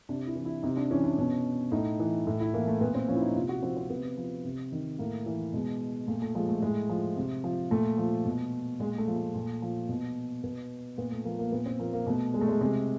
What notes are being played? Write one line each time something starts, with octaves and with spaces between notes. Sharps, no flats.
C3 D4
E4
E3
E4
C3 D#4
D4
E3 C#4
D4
B2 C#4
A2 D#4
E3
A2
E4
E3 A#3
A3
A#2 B3
C4
F3 C#4
E4
D#4
C3 F4
F#4
F3 C4
C4
C3 B3
F3
C3
D#3
A2 A#3
E3
B2 G#3
A#2 A3
A3
F3 G#3
A3
A2 G#3
F3
C3
F3
A#2 A3
F3
B2
A#2 G#3
A3
F3
A3
A#2
F3
B2
B2 B3
A#2 B3
A3
F3 A#3
A#3
A#2 B3
C4
F3 A#3
A#3
B2 A3
G#3
A3
G#3
C3 G#3